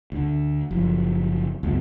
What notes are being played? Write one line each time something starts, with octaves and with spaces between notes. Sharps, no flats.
D2 D3
F#1 F3
C#2 F#2 B3